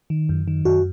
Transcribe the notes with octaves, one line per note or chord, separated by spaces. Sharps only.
D#3
F#2
D#3
F#2 F#4